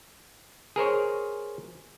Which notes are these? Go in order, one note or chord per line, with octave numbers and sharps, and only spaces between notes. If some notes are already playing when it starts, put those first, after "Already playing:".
G#4 A#4 C5 C#5